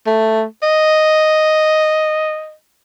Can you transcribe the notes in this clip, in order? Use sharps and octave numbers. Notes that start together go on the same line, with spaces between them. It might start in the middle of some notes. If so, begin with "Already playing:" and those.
A3
D#5